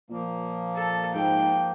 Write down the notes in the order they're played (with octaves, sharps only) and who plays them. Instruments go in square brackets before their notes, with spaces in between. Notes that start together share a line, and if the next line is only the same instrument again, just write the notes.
[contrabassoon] A#2 [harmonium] F3 A#3
[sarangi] A4
[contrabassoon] G#2 [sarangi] G5